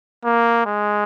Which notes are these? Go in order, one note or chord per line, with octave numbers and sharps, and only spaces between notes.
A#3
G#3